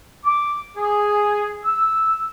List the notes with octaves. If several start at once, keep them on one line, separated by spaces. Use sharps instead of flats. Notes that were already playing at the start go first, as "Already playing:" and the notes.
D6
G#4
E6